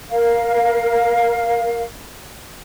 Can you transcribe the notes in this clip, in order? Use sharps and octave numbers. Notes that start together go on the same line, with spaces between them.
A#4 F5